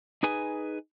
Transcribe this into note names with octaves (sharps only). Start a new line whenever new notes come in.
D#4 G#4 B4 G#5